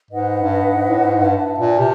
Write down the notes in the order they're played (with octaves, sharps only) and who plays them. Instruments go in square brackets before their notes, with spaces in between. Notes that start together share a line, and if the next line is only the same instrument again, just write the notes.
[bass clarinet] G#2 [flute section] B4 D#5 F#5
[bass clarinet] G2
G2
G#2
A2
G#2
G2
[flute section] B4 E5 A5
[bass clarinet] A#2
C3